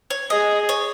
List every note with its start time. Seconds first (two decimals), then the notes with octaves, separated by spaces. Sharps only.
0.10 C#5
0.30 G#4 D#5
0.69 C#5